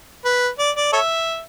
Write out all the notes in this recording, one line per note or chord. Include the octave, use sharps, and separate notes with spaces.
B4
D5
D5
A4 C#5 E5